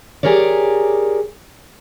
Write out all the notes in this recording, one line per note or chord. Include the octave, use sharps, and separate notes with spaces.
G4 G#4 A#4 C#5 D5